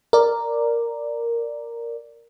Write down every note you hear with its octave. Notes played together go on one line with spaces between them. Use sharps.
A#4 D5